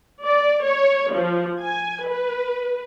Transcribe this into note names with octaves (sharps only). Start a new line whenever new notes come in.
D5
C#5
F3
G#5
B4